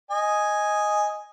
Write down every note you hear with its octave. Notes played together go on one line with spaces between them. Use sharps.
D#5 G#5